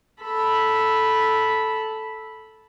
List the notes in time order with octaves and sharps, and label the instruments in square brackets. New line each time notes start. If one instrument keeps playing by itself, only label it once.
[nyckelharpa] A4 B5